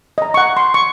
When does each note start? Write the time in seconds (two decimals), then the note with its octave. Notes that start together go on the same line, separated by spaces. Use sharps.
0.18 D#5 A#5
0.34 F#5 C#6
0.57 C6
0.74 C#6